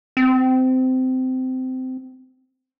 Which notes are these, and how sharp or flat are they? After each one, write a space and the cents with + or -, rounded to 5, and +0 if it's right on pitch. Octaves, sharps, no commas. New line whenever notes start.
C4 -20